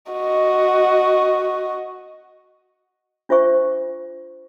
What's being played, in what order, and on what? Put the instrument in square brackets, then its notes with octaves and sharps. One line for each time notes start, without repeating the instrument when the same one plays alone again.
[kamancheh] F#4 D#5
[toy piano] D4 F4 C5 E5 C#6